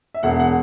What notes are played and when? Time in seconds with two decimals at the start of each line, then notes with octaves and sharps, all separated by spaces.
0.14 E5
0.23 E1 F#5
0.40 F#5